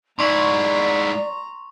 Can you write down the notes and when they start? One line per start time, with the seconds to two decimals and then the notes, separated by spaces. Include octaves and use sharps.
0.19 G#2 E4 D5 A#5 C6 C#6